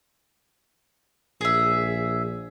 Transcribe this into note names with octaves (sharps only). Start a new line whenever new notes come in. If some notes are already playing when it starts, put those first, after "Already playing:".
A#1 G#4 E5